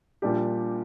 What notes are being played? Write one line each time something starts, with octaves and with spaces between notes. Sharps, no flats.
A#1 A#2 G3 D4 G4